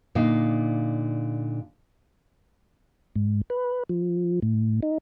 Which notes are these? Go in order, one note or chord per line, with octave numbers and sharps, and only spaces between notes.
A#2 D3 D#4 F5
G#2
B4
F3
A2
D#4